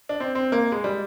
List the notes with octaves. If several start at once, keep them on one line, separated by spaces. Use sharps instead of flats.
D4
C4
C4
A#3
G#3
G3